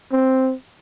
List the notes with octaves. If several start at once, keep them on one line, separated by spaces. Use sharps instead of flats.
C4